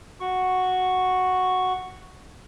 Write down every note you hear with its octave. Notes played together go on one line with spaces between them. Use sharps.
F#4 C#6